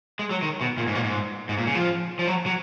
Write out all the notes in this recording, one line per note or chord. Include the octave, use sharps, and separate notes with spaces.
G#3
F#3
D#3
B2
A#2
G#2
A#2
G#2
G#2
A#2
C#3
F3
F3
F#3
F#3